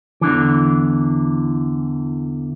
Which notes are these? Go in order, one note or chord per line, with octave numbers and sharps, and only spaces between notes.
E2 D3 E3